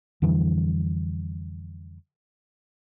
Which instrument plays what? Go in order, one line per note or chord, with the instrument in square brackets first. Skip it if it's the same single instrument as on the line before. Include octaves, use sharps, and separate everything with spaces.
[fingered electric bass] F2 D3 E3 G3